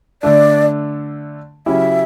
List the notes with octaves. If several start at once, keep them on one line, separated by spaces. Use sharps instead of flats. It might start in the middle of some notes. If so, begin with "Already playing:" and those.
D3 A3 D4 D5
C#3 F#3 C#4 E4 G4 E5